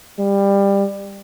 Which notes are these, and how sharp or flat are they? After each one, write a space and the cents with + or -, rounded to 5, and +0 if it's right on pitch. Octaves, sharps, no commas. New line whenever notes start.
G3 +20